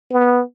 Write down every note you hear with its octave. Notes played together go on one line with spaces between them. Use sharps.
B3